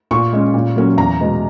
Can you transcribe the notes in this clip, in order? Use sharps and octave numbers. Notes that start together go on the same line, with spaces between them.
A#2 C#6
G#3 C#4
A#2
F#3 A#3 C#4
E2 A#5
B2 G#3